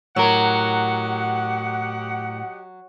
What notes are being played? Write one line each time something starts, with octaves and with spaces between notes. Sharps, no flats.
A2 F#3 G4 A#4 D#5 F#5